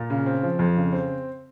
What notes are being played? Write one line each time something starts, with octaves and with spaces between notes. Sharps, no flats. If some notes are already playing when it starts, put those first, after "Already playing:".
Already playing: A#2
C#3
C4
F3
F2
C#3
C4